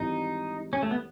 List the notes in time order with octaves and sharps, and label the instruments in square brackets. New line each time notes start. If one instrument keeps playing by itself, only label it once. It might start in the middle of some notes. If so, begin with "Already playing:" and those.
Already playing: [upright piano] G#1 G#2 E3 G3 [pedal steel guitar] D#4
[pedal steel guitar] C#4
A3
B3